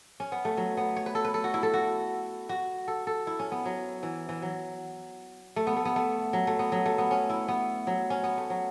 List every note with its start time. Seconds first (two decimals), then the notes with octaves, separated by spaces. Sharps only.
0.20 C#4
0.32 B3
0.45 A3
0.57 F#3
0.77 B3
0.96 C#5
1.06 B4
1.15 A4
1.25 B4
1.34 A4
1.44 F#4
1.54 E4
1.63 A4
1.74 F#4
2.49 F#4
2.88 A4
3.07 A4
3.27 E4
3.39 C#4
3.52 B3
3.65 F#3
4.03 E3
4.29 E3
4.42 F#3
5.56 A3
5.67 B3
5.77 A3
5.85 B3
5.96 A3
6.33 F#3
6.47 A3
6.59 B3
6.72 F#3
6.86 A3
6.98 B3
7.11 C#4
7.30 E4
7.48 B3
7.87 F#3
8.10 C#4
8.24 B3
8.37 A3
8.50 F#3